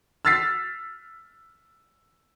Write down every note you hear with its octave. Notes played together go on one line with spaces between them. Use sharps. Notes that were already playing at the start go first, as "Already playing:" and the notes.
E6 F6 A6 B6 C7